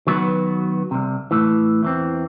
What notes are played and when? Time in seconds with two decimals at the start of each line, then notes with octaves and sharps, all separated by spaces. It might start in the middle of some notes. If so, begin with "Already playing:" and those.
0.07 D#3 F#3 B3 D#4 F#4 B4
0.91 C2 C3
1.31 A2 E3
1.83 E2 E3 C4